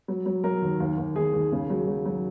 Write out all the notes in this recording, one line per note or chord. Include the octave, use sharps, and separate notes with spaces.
F#3
F#3
F#3 A#4
D#2
D#2
D#2
D#2 G#4
D#2
C#3
F#3
F#3
F#3